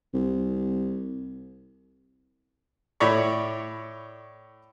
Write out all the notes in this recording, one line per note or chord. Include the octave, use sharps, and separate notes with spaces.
C2
A2 C#5 D5 B5 C#6